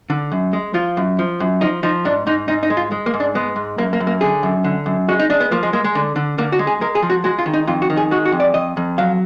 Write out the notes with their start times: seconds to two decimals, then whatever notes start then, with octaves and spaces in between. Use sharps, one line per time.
0.10 D3
0.32 F#2
0.53 G#3
0.74 F3 F4
0.97 F#2
1.19 F3
1.40 F#2
1.61 F3 D#4
1.83 F3 D#4
2.05 G#2 D4
2.27 G#2 D#4
2.48 G#2 D#4
2.63 D#4
2.70 G#3
2.77 F4
2.92 G#3
3.06 A#3
3.14 G#2
3.20 D4
3.35 G#3 B3
3.56 G#2
3.78 F#2 A#3
3.93 A#3
4.00 F#2
4.07 A#3
4.21 D3 G#4
4.43 F#2
4.64 D3
4.86 F#2
5.08 G#3 F#4
5.19 D#4
5.30 G#3 D4
5.40 B3
5.51 F3 A#3
5.63 G#3
5.73 G#3 A#3
5.84 G#3
5.95 D3
6.16 D3
6.38 D3 A#3
6.52 F#4
6.59 G#3
6.67 G#4
6.81 G#3 A#4
6.95 G#4
7.02 F3
7.10 F#4
7.24 G#3 F#4
7.38 F4
7.46 D#3
7.53 D#4
7.67 F2 F4
7.82 F#4
7.90 D#3
7.97 G#4
8.11 G#3 F#4
8.25 F#4
8.32 F2
8.40 D5
8.54 F2 D#5
8.77 F2
8.98 F#3 F5